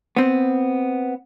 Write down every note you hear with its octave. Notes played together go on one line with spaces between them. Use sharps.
B3 C4